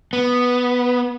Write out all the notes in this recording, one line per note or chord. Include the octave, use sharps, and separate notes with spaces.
B3